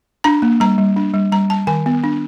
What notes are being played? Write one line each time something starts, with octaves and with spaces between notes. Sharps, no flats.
D4 A#5
A#3
G3 A#5
G3
D4
G3
G3 A#5
G3 A5
D#3 G#5
B3
D4